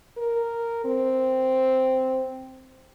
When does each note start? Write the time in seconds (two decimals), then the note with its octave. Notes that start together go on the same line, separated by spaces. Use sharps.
0.17 A#4
0.85 C4